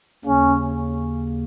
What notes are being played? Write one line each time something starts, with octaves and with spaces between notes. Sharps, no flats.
D#2 C#3 A#3 C#4